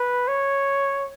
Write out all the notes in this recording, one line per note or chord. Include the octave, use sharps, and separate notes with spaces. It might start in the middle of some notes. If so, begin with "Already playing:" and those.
Already playing: B4
C#5